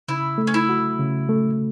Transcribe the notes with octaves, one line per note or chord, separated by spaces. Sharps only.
C#3 E4
A3
C#4
E4
F#4
C#3
A3